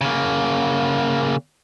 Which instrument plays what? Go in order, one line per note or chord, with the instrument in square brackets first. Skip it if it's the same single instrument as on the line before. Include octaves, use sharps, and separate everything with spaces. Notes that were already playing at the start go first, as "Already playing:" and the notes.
[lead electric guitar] C#3 A#3